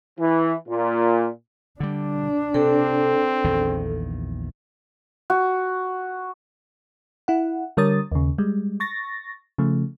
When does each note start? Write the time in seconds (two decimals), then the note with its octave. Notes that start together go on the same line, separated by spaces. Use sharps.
0.19 E3
0.68 A#2
1.80 D3 G3 D4
2.54 C3 C4 A4
3.44 A#1 E2 D#3
5.30 F#4
7.28 E4 F#5
7.77 D3 G3 A#4 C#5 D#6 A6
8.12 D#2 C#3
8.38 G3 G#3
8.80 C#6 A6 A#6
9.58 C#3 F3 A3